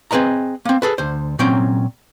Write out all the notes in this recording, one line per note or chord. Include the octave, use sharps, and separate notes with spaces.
C4 G#4 B4 D#5 A#5
A#3 C4
G#4 A4 B4
D2 C5
A#2 F#3 C4 C#4 G5